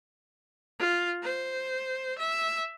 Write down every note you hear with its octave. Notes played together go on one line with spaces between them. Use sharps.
F4
C5
E5